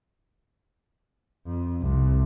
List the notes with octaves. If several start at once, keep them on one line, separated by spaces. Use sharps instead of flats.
F2
C2